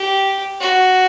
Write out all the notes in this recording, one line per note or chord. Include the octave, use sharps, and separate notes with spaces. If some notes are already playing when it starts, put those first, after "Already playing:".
Already playing: G4
F#4